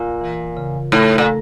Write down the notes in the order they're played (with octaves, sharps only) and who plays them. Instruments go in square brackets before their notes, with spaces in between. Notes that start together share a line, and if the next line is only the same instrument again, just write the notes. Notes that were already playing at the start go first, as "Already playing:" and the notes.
Already playing: [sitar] A#2 [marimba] F4
[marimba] E3
C#3
[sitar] A2 [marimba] A3
[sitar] A#2